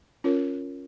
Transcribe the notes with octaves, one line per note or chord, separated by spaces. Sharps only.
C#4 F4 A#4 C#5